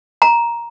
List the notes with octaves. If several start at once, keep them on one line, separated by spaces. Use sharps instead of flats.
A#5